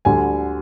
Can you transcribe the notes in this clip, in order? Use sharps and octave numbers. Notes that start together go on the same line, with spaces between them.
D2 D3 G3 G#5